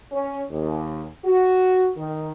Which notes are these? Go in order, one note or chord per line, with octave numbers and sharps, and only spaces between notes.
C#4
D#2
F#4
D#3